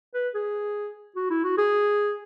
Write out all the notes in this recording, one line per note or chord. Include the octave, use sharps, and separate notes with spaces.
B4
G#4
F#4
E4
F#4
G#4